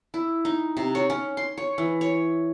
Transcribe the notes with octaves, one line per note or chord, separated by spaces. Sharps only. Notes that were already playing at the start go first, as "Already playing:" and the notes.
E4
D#4
C3
C#5
C#4
C6
C#5
E3
C#5